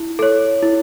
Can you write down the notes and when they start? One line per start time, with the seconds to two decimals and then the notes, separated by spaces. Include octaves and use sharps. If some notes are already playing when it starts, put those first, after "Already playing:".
Already playing: E4
0.19 A4 C#5
0.63 E4